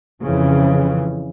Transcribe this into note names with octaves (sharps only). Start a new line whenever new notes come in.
F2 C#3 E3